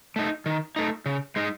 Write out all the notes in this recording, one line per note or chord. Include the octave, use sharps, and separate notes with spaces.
A3 D#4
D#3
A3 D#4
C#3
G#3 D#4